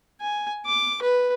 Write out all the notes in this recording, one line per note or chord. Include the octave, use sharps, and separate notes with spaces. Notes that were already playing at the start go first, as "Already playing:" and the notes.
G#5
D6
B4